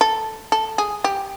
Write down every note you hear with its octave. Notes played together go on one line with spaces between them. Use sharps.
A4
A4
G#4
G4